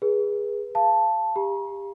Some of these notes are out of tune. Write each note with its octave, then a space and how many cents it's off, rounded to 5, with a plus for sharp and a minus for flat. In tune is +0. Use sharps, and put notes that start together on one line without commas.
G#4 -15 B4 -25
F5 -20 A5 +0
G4 +25 A#5 +40